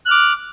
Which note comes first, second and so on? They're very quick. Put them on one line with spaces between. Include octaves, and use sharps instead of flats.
F#6 F6 D6